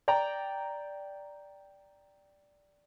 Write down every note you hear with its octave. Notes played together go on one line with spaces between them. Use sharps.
D5 G5 A#5